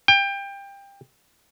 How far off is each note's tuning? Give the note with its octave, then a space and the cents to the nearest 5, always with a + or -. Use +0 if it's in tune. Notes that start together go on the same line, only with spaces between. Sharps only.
G5 +25